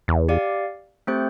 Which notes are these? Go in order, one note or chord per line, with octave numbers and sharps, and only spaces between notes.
E2
G4 D5 F5
A3 C4 G4 C5 G5